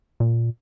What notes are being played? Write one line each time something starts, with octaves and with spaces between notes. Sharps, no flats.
A#2